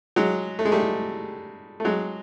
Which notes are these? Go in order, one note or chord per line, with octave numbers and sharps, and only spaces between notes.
F#3 G#3
A3
G#3
G3 A3
A3
F#3 G#3